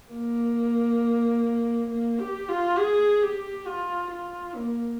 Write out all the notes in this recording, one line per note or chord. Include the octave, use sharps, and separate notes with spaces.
A#3
A#3
G4
F4
G#4
G4
F4
F4
A#3